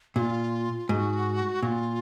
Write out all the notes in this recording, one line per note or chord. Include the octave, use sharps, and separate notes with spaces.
A#2 F4 F#4
G#2 F#4
A#2 F4 F#4